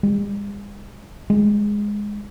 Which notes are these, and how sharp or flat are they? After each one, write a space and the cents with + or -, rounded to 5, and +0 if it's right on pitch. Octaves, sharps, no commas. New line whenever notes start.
G#3 -45
G#3 -5